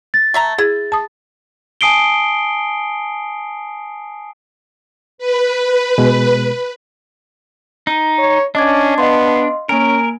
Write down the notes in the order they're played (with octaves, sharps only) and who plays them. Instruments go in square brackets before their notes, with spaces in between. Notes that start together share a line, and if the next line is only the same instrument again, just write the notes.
[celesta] A6
[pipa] A3 E5 A#5
[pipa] E4 [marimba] G#4
[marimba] A5 D#6
[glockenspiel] G#5 A5 D#6 C7 D7 G7
[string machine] B4
[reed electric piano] B2 G#3
[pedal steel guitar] D#4
[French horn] C#5
[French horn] C#4 [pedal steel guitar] D4 [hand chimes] D#5 D6 G#6
[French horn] B3 [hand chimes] D#5 F5 C6
[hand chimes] A#3 G#5 D7 [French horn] C#4 [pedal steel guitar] A#4